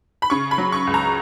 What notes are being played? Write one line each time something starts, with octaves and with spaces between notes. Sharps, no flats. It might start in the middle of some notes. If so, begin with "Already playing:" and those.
B5
C#3 C#6
B5
F#3
C#6
C#2
A#5